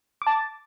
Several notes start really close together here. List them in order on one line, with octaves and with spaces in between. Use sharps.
D6 A5 A6